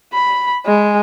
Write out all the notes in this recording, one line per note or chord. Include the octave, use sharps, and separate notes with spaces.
B5
G#3